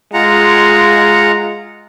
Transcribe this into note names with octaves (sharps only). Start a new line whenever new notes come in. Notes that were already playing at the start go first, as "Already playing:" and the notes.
G#3 F4 F#5 A#5